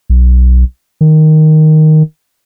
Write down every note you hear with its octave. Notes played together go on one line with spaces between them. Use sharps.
B1
D#3